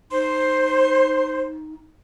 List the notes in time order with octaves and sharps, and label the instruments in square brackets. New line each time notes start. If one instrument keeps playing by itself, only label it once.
[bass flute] D#4 [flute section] C5 C6